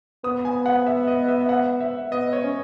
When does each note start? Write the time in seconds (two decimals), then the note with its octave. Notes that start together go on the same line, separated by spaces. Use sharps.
0.24 B3 D#6
0.45 G#5
0.66 F#5
0.87 E5
1.07 D#5
1.28 E5
1.41 E5
1.49 F#5
1.81 E5
2.11 B3 D#5
2.33 C#5
2.43 C#4